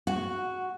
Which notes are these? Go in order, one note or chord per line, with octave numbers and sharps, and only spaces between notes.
F#4